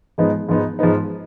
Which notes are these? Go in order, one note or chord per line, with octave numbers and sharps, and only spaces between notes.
G#2 F3 G#3 B3 D#4
G#2 F3 G#3 B3 D#4
G#2 F3 G#3 B3 D#4